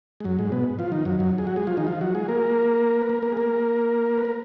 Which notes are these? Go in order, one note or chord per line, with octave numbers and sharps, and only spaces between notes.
G#3
F#2 F#3
G#2 G#3
B2 B3
F3 F4
D#3 D#4
F#2 F#3
F#2 F#3
G#4
F#3 F#4
G#3 G#4
F3 F4
D#3 D#4
F3 F4
F#3 F#4
G#3 G#4
A#3 A#4
B4
A#3 A#4
A#3 A#4
G#4
A#3 A#4
B4
A#4